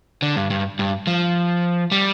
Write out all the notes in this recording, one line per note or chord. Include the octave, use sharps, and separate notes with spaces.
D3
G2
G2
G2
F3
G3